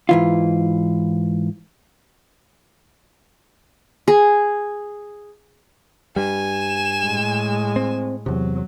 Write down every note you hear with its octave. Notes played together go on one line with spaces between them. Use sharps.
G#2 E3 F4
G#4
G2 G3 G#5 E7
A2 G#3
C4
E2 C3 F#3